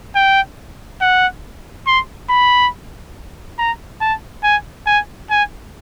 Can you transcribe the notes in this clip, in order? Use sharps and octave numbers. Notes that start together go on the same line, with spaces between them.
G5
F#5
C6
B5
A#5
A5
G#5
G#5
G#5